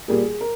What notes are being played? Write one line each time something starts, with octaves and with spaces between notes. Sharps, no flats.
A#2 G3 A#3 G#4
A#4